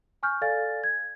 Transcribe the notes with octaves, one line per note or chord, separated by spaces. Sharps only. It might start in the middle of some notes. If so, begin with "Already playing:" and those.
G#5 C#6 F6 G6
A4 D5 F5 G#5 A6
G#6